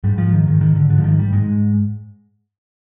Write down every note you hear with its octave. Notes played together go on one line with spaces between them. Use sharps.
G#2 G3
F3
D#3
G#2 D#3
D#3
D3
G#2 D3
F3
D#3
G3
G#2 G#3